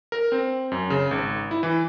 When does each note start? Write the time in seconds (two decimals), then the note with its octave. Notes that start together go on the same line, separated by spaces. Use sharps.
0.12 A#4
0.32 C4
0.72 F#2
0.90 C#3
1.11 G#1
1.51 E4
1.63 E3